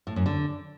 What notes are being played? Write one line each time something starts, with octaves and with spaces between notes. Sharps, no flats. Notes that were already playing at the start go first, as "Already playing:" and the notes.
A2
F#2
D3